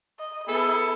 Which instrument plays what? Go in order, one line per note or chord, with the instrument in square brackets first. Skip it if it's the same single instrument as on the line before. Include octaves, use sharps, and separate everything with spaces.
[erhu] D#5
[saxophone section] B3 G#4 A4 [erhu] E4